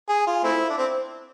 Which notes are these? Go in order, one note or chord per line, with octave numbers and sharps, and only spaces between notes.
G#4
F4
A3 C4 E4
D4
C4